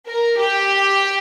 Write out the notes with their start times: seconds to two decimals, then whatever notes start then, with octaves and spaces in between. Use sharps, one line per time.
0.09 A#4
0.39 G4